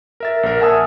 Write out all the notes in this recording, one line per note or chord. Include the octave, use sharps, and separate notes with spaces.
A#4 E5 A6
A#1 A#4
E5 F#5 G#5 A5 D#6 E6